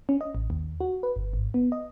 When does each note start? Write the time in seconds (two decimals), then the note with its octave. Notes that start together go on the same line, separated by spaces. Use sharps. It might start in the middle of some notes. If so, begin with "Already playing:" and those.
0.09 C#4
0.21 D#5
0.35 A1
0.50 D#2
0.81 F#4
1.03 B4
1.16 G1
1.33 G#1
1.54 B3
1.72 D#5